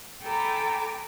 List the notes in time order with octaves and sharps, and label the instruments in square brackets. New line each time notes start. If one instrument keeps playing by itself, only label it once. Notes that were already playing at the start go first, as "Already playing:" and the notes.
[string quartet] A4 G5 G#5 A#5 B5 D6